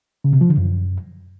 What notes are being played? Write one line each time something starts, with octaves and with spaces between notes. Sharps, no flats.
C#3
C3
F3
D3
F#2